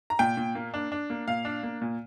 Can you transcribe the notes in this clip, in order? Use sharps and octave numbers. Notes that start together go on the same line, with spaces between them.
A#5
A#2 G5
A#2
A#3
D4
D4
A#3
A#2 F5
D4
A#3
A#2